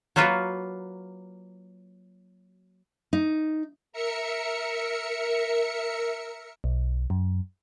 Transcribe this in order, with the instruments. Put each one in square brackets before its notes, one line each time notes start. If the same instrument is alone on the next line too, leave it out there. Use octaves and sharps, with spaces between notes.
[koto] F#3 A#3 F4 F#4 B4
[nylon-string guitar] D#4
[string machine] A#4 E5 C#7
[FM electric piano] B1
F#2